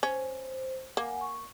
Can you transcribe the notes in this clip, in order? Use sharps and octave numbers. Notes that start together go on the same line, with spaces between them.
C#4 C5
A#3 F#5 G#5
C#6